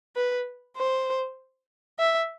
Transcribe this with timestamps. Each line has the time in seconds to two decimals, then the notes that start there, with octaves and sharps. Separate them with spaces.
0.16 B4
0.77 C5
1.99 E5